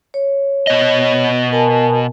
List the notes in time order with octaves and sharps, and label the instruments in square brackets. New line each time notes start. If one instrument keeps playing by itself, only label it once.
[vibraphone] C#5
[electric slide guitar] B2 D#5
[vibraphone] A#4 G#5 A5